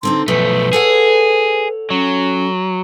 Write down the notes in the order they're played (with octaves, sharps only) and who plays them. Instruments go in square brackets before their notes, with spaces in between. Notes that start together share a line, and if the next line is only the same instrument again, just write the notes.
[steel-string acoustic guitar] D3 C4 D#4 [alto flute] C6
[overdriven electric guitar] B1 A3 [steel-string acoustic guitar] F3 [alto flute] B4
[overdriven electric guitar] G#4 [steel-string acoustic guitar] A4 C#5 F#5
[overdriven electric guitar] F#3 [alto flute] C#4